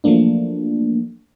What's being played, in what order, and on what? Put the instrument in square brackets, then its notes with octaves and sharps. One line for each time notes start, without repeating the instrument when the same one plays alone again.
[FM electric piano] F3 F#3 A3 A#3 D4